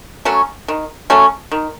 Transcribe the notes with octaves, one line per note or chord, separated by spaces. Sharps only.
F#3 A3 C#4
D#3
F#3 A3 C#4
D#3